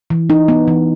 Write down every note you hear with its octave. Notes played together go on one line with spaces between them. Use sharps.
E3
D#4
B3
E3